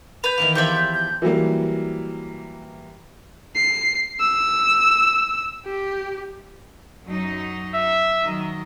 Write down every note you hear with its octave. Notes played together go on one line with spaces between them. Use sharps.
B4 G6 F7
D#3 E3 A#3
E2 F3 G4 E5 B5 G6
G6
E3 F#3 G3 A#3
C7
E6
G4
F#2 F#3 D#4
E5
D#3 F#3 D#5